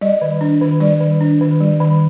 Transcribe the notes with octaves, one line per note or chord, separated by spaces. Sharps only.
G3 D#5
D#3
D4
D#3
G3 D5
D#3
D4
D#3
G3
D#3